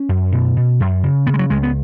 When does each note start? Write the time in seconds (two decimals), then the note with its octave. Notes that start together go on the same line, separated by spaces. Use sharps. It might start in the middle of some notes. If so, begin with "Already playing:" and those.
Already playing: C#4
0.09 F#2
0.32 B2
0.57 B2
0.80 F#2
1.03 C#3
1.27 C#3 B3
1.34 G#3
1.39 F#3
1.50 C#2 G#3
1.63 B3